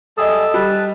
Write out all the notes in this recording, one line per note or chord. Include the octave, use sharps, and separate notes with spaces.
G3 G#4 A4 D#5 E5 D#6
G3 B4 A5